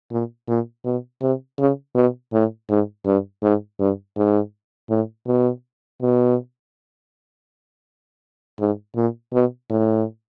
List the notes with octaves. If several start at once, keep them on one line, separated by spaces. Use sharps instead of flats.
A#2
A#2
B2
C3
C#3
B2
A2
G#2
G2
G#2
G2
G#2
A2
B2
B2
G#2
A#2
B2
A2